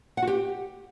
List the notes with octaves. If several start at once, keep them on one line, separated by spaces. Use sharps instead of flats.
F#5
F#4
G4